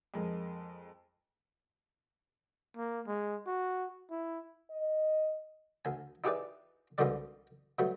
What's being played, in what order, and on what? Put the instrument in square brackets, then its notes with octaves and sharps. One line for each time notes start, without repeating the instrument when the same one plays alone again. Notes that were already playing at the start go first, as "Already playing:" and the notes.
[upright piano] F2 G#3 A#4
[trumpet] A#3
G#3
F#4
[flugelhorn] E4
[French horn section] D#5
[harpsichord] D2 G#5
D#4 E4 G4 G#4 B4 D5
C2 G#2 B2 D3 G3 D5
B2 F#3 G3 A3